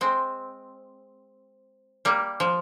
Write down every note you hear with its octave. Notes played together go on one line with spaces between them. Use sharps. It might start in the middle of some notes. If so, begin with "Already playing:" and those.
G#3 C4
G3 A#3
F3